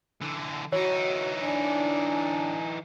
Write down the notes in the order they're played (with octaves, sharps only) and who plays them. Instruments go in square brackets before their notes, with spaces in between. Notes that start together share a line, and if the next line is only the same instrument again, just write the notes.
[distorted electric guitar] D3 E3
[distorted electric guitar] E3 D#4 [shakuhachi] F#4 [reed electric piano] C#5
[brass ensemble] D4 [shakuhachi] G#5